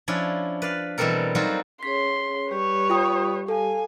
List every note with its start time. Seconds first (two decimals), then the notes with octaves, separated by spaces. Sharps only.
0.08 F3 C#4 D4 E4
0.62 B4 D5 F5
0.98 B2 E3 G3 C4 A4 A#4
1.35 F#3 G3 C4 D#4 F4 F#4
1.83 C#4 G#4 C#5 C6 B6
2.51 G3 G4 B4 C#5 D5
2.90 F4 G5 D#6
3.48 A4 F5 G#5